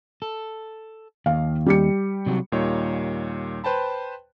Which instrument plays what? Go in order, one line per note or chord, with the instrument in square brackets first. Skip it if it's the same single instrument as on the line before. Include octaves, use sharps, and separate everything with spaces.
[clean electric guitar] A4
[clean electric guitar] D#2 [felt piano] F5
[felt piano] G3 G4 C#7
[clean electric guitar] C3 F#3 F#4
[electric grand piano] D#2 A#2 G3 D#4 C#5
B4 C5 G5 A5 B5